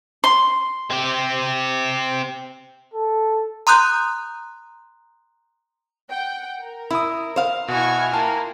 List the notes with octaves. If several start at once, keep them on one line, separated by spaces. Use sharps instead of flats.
C6
C4 G4
A4
A#5 C6 D#6 F#6 G6
F#5 G5
A#4
E4 B5 D#6
C5 F5
B2 E4 F#4 G#5 C#6 F6
A#3 F4 G5 A5